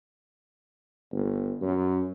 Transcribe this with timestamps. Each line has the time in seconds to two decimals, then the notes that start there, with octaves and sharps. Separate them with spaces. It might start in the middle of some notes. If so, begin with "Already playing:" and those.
1.13 G1
1.61 F#2